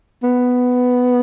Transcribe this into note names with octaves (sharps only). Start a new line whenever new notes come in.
B3